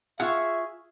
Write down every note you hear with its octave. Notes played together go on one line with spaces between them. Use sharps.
F4 G#4 E5 F#5 C#6 E6